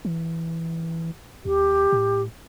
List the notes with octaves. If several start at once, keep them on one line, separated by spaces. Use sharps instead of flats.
E3
D#2 G4
A2